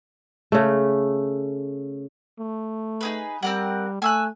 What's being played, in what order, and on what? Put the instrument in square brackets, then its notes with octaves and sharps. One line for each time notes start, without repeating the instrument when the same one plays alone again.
[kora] C#3 A3
[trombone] A3
[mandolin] D#4 G#4 B4
[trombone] G3 [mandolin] C4 A#4 F#5
[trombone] A3 [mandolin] G#5 E6 F#6